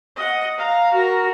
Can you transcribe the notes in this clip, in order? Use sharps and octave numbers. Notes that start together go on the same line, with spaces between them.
D#5 F#5
F5 A#5
F#4 A#4